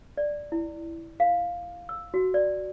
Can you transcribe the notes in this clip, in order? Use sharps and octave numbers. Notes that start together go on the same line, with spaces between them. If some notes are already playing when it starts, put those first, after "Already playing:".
D5
E4
F5
E6
F#4
D5